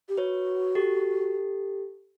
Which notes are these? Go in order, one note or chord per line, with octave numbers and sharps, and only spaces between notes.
G4
F#4 B4 C#5
G4 A4